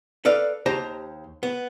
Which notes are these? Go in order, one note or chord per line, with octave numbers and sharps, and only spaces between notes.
A4 B4 D5 F5
D#2 G4 C5 A5 A#5
B3